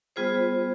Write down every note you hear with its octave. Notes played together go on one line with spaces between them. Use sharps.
G3 B3 F4 G#4 C5